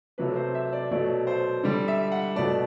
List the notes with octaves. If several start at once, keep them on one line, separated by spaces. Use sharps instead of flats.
C3 F#3 A3 B4
C5
E5
D5
B2 F#3 A3 D5
C5
D3 G3 D5
E5
F#5
B2 A3 D5